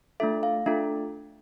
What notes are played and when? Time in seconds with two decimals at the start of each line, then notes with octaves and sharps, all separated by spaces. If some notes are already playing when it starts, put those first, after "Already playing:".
0.20 A3 D4 F4 A4 E5
0.43 F5
0.66 A3 D4 F4 A4 E5